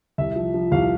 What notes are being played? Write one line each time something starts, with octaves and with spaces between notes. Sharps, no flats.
C2 E5
F3
F3
C2 F5